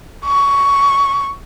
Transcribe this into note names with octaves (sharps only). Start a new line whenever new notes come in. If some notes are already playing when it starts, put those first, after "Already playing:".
C#6